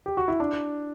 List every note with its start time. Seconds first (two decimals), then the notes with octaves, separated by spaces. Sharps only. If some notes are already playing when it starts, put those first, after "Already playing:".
0.06 G4
0.17 F#4
0.28 E4
0.40 D4